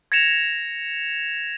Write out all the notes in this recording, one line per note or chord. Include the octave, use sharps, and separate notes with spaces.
G#6 A#6 C#7 E7 F7